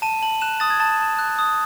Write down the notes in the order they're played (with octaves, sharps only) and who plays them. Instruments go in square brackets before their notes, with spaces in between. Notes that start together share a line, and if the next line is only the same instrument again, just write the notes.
[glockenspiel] A5 D#7
A5 F#7
F#6 E7
D#6 A6
G#6
A5 A6
A5
F#6
D#6